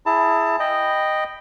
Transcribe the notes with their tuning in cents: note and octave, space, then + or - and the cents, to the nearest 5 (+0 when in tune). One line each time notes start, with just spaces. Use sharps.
E4 +0 G#4 +0 A5 +25
D#5 -5 G5 +0 B5 +0